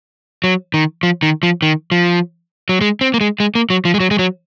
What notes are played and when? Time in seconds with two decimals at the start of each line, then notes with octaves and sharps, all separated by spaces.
0.44 F#3
0.74 D#3
1.03 F3
1.23 D#3
1.43 F3
1.62 D#3
1.92 F3
2.69 F#3
2.81 G#3
3.01 C4
3.14 A#3
3.21 G#3
3.40 G#3
3.55 A#3
3.70 F#3
3.85 F3
3.94 G#3
4.00 F#3
4.11 G#3
4.19 F#3